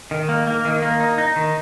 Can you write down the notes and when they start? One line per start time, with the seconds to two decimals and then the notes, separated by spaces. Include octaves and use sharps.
0.11 D#3
0.29 A#3
0.47 A#3
0.65 D#3
0.82 A#3
1.00 D#4
1.18 D#4
1.36 D#3